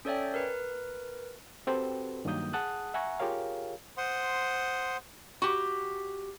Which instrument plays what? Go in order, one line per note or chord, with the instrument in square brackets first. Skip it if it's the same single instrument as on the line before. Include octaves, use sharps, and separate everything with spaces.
[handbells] C#4 A4 C#5 D5 E5 G5
A#4 B4
[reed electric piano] C4 F#4 G4 A4 B4 C5
G2 D#3 F#3 A#3 D#6 G6
G#4 F#5 A5 D#6 F#6
E5 F#5 G#5 A#5 C#6
F4 G4 G#4 A#4 C#5 F5
[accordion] C5 F#5 C6 D#6
[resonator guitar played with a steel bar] F#4 G4